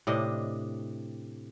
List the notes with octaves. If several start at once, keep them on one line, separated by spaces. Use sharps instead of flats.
A2 C3 D4 D#5